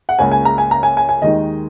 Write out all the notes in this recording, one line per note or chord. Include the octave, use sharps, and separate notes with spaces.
F#5
C#2 C#3 A#3 C#4 G#5
G#5
A#5
G#5
A#5
G#5
G#5
G#5
D#2 D#3 G#3 D#4 D#5